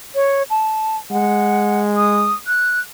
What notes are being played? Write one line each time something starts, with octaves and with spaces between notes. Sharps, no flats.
C#5
A5
G#3 F#5
D#6
F#6